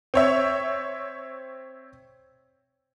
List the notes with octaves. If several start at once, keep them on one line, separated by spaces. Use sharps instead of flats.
C4 C#5 E5